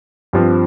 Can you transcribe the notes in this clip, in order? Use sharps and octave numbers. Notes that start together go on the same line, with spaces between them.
G2 F3 C4